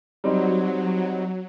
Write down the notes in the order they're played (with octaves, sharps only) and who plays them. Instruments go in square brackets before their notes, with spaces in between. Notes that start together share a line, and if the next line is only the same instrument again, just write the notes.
[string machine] F#3 [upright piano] G3 C4 D#4